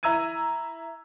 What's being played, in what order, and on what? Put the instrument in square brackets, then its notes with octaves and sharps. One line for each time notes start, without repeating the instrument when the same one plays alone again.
[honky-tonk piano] E4 E5 A#5 E6 G#6 D#7